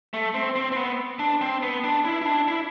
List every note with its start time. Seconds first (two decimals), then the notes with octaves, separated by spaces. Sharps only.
0.14 A3
0.34 C4
0.56 C4
0.72 C4
0.76 B3
1.19 D4
1.41 C4
1.63 B3
1.84 D4
2.05 E4
2.22 E4
2.26 D4
2.48 E4